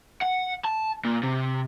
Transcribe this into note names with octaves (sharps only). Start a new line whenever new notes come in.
F#5
A5
A#2
C3